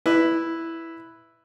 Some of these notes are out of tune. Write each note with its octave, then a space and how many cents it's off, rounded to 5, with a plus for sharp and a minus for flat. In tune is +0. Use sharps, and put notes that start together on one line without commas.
E4 +0 B4 +0 D5 +40